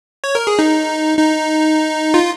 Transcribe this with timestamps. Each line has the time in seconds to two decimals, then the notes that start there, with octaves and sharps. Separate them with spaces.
0.24 C#5
0.35 A#4
0.47 G#4
0.59 D#4
1.19 D#4
2.14 F4